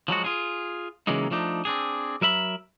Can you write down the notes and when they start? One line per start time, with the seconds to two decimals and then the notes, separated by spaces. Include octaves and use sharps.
0.08 F3 F#3 G#3 F#4
0.24 F4 G#4
1.07 C#3 E3 F#3 G#3 A#3 D#4
1.31 F3 A3 D4 D#4
1.65 C4 D4 G#4
2.21 F#3 A#4 E5 B5